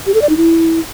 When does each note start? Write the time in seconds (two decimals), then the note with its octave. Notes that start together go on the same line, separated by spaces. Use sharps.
0.07 G4
0.14 A4
0.22 D5
0.29 D#4
0.37 E4